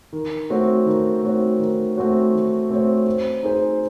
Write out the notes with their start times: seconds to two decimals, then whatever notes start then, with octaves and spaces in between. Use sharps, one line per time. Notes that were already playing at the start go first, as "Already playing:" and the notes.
0.13 D#3
0.50 A3 C4 F#4 C#5
0.86 D#3
1.23 A3 C4 F#4 C#5
1.59 D#3
1.96 A3 C4 F#4 C#5
2.33 D#3
2.70 A3 C4 F#4 C#5
3.06 C4
3.43 D#4 G#4 C5